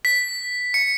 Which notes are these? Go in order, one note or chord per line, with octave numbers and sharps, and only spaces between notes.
B6
C#7